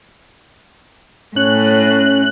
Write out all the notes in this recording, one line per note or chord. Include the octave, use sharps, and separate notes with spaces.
A2 C#4 C#5 F#6